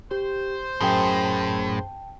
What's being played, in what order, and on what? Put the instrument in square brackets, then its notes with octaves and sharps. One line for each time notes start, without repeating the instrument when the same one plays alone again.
[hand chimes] G4 [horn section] C5
[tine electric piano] F#2 G#4 C6 [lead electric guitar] A2 [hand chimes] G5 A5